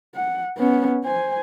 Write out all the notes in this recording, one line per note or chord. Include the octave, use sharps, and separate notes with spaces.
F#5
B3 C#4
C5 G#5